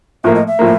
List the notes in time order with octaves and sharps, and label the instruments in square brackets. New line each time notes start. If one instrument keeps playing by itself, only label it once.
[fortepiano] A2 F3 A#3 [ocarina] E5
[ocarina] D#5
E5
[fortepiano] A2 F3 A#3